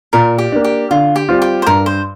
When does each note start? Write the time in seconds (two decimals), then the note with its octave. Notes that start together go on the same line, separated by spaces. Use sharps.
0.13 A#2 A#4
0.38 G4
0.52 A#3 D4
0.64 G4
0.91 D3 F4
1.16 G4
1.29 G3 C4 F4
1.42 G4
1.62 C5
1.67 G2 A#4
1.86 C5